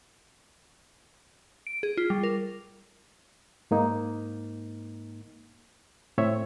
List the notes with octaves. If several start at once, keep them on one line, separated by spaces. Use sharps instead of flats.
D7
G#4
F4
G3
A#4
G#2 A#3 D#4
A2 C4 C#5 E5